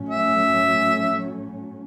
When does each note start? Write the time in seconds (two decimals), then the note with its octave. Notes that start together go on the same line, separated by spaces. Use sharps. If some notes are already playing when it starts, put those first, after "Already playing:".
Already playing: A2 F#3 A3 C#4
0.09 E5